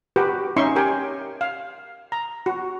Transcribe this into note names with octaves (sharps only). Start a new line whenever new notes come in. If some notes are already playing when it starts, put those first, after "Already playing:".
F#4 G4 A#4 B4 G5
C#4 D#4 E5 C6 C#6
G4 A#4 G5 G#5
F5
A#5
F#4